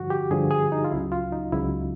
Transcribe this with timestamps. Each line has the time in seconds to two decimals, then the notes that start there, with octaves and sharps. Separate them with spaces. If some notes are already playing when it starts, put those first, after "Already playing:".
Already playing: G2 D3 F3 F#4
0.10 G4
0.31 G2 D3 F3 G#4
0.51 G#4
0.72 D#4
0.84 F4
0.92 C#2 C#3 F#3 E4
1.12 F4
1.32 D#4
1.52 C#2 C#3 F#3 E4